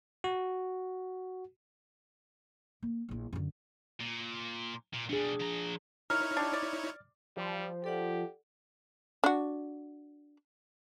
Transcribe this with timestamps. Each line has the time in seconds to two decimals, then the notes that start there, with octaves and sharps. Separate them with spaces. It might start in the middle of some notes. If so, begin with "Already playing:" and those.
0.24 F#4
2.83 A#3
3.09 A#1 E4
3.33 F#2 D3
4.00 A#2
4.93 A#2
5.10 B2 G3 D4 G#4
5.41 F3 A#5
6.10 D#4 E4 A#4 C#5 F6
6.37 D4 G4
6.53 D5
7.37 F3 G3
7.84 G4 A4 D5 F#5
9.24 D4 F#4